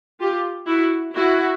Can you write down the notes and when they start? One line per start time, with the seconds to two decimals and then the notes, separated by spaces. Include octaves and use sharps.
0.20 F4 G4
0.67 E4 F#4
1.13 E4 F#4